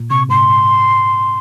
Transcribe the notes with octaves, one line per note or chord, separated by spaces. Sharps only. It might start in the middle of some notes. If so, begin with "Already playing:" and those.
Already playing: A#2
C3 C#6
G#2 C6